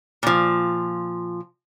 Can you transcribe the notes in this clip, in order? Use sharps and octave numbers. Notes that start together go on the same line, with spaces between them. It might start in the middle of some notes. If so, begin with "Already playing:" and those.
A#2 F3